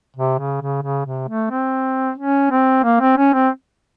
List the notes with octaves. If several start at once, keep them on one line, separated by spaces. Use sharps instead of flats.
C3
C#3
C#3
C#3
C3
A3
C4
C#4
C4
A#3
C4
C#4
C4